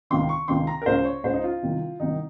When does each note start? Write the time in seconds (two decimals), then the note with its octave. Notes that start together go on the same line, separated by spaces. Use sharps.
0.10 C#2 C3 D#3 C6
0.29 C#6
0.48 C#2 C3 D#3 C6
0.67 A#5
0.82 A#4
0.86 C#2 C#3 C5
1.05 C#5
1.24 C#2 C#3 C5
1.34 D#4
1.44 F4
1.62 C2 C3 D#3
2.00 C2 C3 D#3 D#4